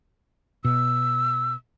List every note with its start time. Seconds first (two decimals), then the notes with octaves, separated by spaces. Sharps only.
0.65 B2 E6